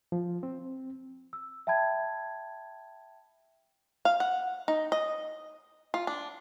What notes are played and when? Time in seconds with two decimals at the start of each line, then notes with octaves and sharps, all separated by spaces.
0.12 F3
0.43 C4
1.33 E6
1.67 E5 G5 A5 B5 G#6
4.05 F5
4.20 F#5
4.68 D#4
4.92 D#5
5.94 F4
6.07 D4